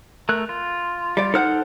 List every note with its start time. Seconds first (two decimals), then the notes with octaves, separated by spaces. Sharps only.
0.29 A3 A#4 F#6
0.49 F4
1.17 G3 D5
1.34 D#4 A4 C5 F#5 F6 F#6